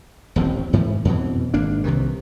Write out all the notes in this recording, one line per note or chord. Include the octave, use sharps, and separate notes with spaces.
D#1 A1 F3 C4
G#2 E3 F3
F2 B2 E3
G#1 A#3 D4
C2 C3 D#3 E3